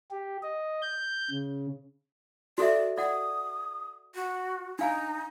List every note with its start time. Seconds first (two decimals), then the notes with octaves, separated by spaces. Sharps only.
0.11 G4
0.43 D#5
0.82 G6
1.31 C#3
2.58 F#4 A4 D5 E5
2.98 D5 F#5 D#6
4.15 F#4
4.79 D4 D#4 F5 G#5